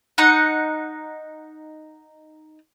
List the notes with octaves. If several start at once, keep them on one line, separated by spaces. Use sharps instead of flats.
D#4 F#5